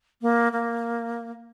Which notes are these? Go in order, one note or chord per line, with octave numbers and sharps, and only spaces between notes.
A#3
A#3